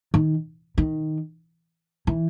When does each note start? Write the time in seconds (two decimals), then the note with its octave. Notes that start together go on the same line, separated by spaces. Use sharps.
0.14 D#3
0.78 D#3
2.07 E3